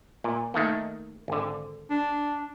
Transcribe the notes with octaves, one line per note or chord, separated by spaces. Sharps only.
A#2
D#3 A3 A#3
G#1 D3
D4